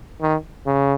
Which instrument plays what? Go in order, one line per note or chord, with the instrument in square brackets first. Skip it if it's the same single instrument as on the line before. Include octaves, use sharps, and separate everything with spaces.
[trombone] D#3
C#3